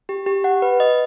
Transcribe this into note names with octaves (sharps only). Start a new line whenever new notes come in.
G4
G4
F#5
B4
D#5